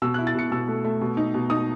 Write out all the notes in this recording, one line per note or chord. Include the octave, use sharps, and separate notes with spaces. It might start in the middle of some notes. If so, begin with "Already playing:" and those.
B2 E6
E4 F#6
A6
B2 C#7
B2 E6
A3
A3
B2
D#4
B2
D#4 D#6